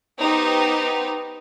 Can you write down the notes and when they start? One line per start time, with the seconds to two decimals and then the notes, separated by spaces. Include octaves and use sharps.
0.20 B3 D#4 G4 C5